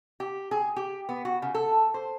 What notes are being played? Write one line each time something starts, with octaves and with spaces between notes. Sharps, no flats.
G4
G#4
G4
B3
F#4
C#3
A4
C5